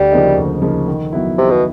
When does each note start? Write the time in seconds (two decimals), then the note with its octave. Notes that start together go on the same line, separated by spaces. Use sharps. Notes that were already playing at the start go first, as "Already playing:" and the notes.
Already playing: D2 G3
0.12 C#3 F3 A#3 D#4
0.37 D2
0.62 C#3 F3 A#3 D#4
0.88 D#3
1.13 F#3 B3 E4
1.38 C3 D#3
1.51 B2